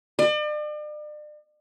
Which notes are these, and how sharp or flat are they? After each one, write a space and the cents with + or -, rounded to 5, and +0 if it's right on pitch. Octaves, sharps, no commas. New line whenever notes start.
D5 +40